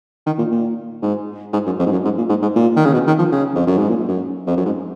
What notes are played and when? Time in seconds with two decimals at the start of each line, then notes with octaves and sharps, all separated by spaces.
0.26 D#3
0.38 A#2
0.51 A#2
1.02 G#2
1.53 G#2
1.66 F#2
1.79 F2
1.86 G#2
1.92 F#2
2.05 G#2
2.18 A#2
2.29 G#2
2.42 G#2
2.55 A#2
2.76 D#3
2.85 C#3
2.93 B2
3.07 D#3
3.19 F3
3.31 C#3
3.55 F2
3.67 F#2
3.78 G#2
3.89 A#2
4.08 F#2
4.47 F2
4.57 F#2
4.65 G#2